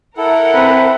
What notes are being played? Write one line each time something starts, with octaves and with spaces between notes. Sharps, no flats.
E4 A4 A#4 F#5
C4 B4